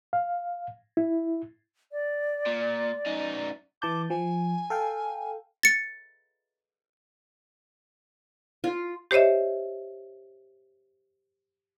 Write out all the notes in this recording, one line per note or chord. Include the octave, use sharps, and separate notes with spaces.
F5
E4
D5
A#2
F#2 D#4
E3 A5 D6 G6
F3 G#5
A4 F5 G5
A6 C#7
F4
G4 C5 C#5 D#5 E5